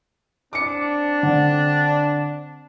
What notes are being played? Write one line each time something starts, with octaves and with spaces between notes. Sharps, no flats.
C4 D4 D6 C#7
D3